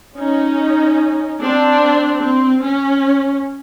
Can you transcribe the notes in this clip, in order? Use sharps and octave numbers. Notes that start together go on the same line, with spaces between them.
C#4 D#4
C4 D4
C4
C#4